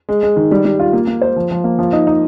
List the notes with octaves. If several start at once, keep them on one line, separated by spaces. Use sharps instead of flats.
G#3
G#3
D#3
G3
G3
F4
A#3
A#3
C5
F3
F3
A#3
F3
D#4
D#4